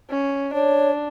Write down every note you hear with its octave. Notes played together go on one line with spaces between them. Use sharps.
C#4
D4 C#5